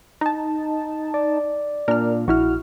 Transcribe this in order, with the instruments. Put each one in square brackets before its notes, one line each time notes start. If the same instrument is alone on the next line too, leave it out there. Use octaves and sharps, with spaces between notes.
[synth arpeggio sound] D#4 A5
[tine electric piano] D5
[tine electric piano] A#2 D4 [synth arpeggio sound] A#4 F6
[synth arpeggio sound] A#1 E4 F6 [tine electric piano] F#4